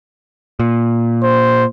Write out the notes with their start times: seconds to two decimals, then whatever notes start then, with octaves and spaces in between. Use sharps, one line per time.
0.60 A#2
1.23 C5